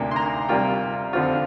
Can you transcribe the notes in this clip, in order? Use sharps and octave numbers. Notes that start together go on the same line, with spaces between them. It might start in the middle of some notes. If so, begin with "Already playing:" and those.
Already playing: D2 C3 A#3 D4 G5
C6
A#5
C3 G3 A#3 F4 G5
F2 D3 F3 C4 F4